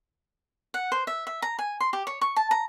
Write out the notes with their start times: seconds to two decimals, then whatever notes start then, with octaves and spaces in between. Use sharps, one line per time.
0.74 F#5
0.92 C5
1.07 E5
1.27 E5
1.42 A#5
1.59 G#5
1.80 C6
1.93 G4
2.07 C#5
2.21 C#6
2.36 A5
2.51 A#5